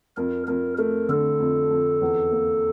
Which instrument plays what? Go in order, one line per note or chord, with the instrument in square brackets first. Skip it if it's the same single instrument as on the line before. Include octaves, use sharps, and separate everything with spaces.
[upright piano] F2 [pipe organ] A#4
[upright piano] F2 [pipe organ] A#4
[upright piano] A3 [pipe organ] A#4
[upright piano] D3 [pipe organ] A4
[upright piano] F2
F2
E2
A#3